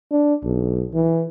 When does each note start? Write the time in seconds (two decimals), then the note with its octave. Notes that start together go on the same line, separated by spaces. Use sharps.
0.11 D4
0.44 B1
0.94 E3